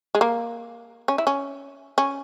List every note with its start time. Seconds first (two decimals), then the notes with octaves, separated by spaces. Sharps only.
0.15 G#3
0.21 A#3
1.08 C#4
1.18 E4
1.27 C#4
1.98 C#4